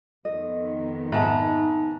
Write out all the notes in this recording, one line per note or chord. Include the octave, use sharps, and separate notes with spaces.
F2 D#3 B3 A4 D#5
G#2 D#4 E5 A5 B5